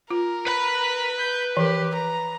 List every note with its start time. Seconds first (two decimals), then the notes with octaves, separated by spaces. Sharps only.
0.11 F4 A#4
0.47 B4 B5
1.19 G6
1.57 E3 F3 G4 A#4
1.94 A#5